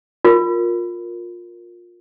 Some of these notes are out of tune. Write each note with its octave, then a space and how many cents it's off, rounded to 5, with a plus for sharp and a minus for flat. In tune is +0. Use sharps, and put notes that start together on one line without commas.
F4 +20 A#4 +0